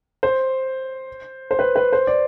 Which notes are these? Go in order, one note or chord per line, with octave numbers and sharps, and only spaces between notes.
C5
C5
B4
B4
C5
D5